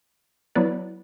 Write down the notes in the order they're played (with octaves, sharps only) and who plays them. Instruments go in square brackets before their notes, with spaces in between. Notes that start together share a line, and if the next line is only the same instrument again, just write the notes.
[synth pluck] F#3 B3 E4 B4 D5